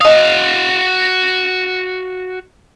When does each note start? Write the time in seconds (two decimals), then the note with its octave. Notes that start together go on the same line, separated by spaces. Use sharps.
0.01 F#4 D#5 F5 D#6